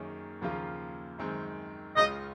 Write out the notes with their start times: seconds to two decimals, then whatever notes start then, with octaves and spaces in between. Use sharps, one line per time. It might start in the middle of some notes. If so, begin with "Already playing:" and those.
Already playing: F#2 D#3 A#3 C#4 G#4
0.41 D#2 C#3 F3 A#3 F4
1.18 F#2 D#3 G#3 C4
1.97 C#2 C#3 G#3 C#4 F4 D#5